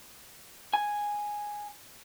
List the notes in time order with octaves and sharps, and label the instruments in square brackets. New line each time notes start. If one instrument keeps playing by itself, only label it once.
[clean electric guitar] G#5